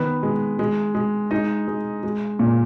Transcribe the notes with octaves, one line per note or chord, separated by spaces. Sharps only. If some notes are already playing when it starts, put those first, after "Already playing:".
Already playing: D#3 B3 B4
G#3
G#3
G#3
G#3 D#4 D#5
G#3
G#3
A#2